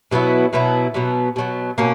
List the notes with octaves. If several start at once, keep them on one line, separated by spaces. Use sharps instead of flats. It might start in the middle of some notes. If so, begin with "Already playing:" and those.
B2 F#3 B3 E4
B2 F#3 B3 E4
B2 F#3 B3
B2 F#3 B3
B2 A#3 C#4